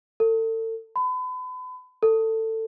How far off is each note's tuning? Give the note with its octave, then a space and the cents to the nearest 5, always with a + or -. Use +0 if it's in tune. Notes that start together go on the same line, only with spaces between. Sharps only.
A4 +35
B5 +40
A4 +20